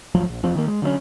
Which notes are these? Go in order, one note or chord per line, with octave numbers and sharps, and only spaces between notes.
G#1 D2 F3 F#3
A#1
F1 E2 F3 C4
D#3 A#3
G#3
D3 F#3 A3 C#4